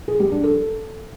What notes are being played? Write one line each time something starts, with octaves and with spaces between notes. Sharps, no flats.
G#4
G3
D4
A4